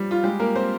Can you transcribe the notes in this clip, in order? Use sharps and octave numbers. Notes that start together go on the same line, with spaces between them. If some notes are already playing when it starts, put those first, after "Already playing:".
Already playing: F3 G3
F4
G#3 G4
A#3 A#4
C4 C5